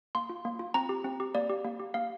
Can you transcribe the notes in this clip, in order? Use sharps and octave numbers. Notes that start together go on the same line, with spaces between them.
A#3 C6
F4
A#3
F4
C4 A#5
G4
C4
G4
A#3 D5
G4
A#3
G4
A#3 F5